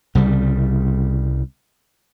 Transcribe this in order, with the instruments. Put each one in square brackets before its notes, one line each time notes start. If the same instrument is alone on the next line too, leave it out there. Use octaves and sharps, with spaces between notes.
[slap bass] C2 C#3 G3